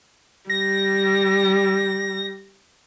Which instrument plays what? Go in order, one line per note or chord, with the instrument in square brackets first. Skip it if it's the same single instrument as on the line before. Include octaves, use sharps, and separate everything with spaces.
[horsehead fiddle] G3 [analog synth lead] A#6